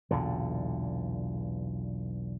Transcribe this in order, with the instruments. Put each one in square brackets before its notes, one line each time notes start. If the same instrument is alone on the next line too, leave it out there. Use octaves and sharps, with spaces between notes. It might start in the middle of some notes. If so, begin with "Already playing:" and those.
[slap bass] B1 E2 A#2 D3